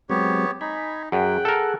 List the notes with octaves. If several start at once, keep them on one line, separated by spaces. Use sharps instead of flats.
F#3 G#3 B3 C4 G4 C#5
D#4 G#5 B5
F#2 G#4 F#5 G5
A4 A#4